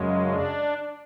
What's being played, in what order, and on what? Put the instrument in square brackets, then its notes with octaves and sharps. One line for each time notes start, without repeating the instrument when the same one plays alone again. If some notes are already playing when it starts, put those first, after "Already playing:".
Already playing: [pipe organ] F#2 C#3 G#3
D4